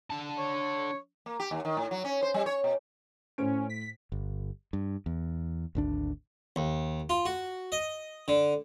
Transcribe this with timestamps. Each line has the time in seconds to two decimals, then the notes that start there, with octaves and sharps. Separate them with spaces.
0.10 D3 A5
0.38 C#5
1.26 A#3
1.40 G4
1.51 D#2
1.65 D#3
1.77 A2
1.91 F#3
2.05 C#4
2.22 C5
2.34 G3
2.46 C#5
2.64 B2
3.38 A2 C#4 C5 D7
3.70 B6
4.12 G1
4.73 G2
5.06 E2
5.75 G#1 D2 D4
6.56 D#2
7.10 F4
7.26 F#4
7.72 D#5
8.28 D3